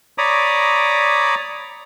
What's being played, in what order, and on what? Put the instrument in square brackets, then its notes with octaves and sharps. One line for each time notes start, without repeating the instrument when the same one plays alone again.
[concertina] C#5 D5 A#5 B5 D6 D#6